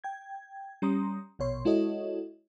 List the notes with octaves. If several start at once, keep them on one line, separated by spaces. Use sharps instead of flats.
G5 G#6
G3 C#4 A#5 C6 D#6
A#1 B2 C#5 C6
G#3 E4 F#4 A4 C#5 D#5